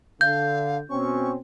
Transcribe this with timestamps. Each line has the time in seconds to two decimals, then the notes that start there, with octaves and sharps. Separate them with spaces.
0.21 D3 F5 G6
0.90 B2 C4 C#4 C#6